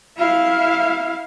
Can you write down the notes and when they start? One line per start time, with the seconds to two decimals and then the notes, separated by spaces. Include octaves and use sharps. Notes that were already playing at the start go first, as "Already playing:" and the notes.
0.17 E4 F5